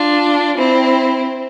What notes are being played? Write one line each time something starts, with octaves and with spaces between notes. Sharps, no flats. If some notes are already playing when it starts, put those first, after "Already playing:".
Already playing: D4 F4
C4 E4